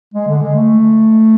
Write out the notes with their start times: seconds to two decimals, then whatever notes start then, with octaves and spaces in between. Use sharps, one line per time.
0.14 G#3
0.28 D3
0.42 G#3
0.56 A3